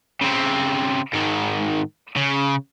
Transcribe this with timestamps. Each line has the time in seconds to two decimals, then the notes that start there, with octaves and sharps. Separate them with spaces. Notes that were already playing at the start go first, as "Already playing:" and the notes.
0.21 C#3 C4
1.13 G#2 D#3
2.17 C#3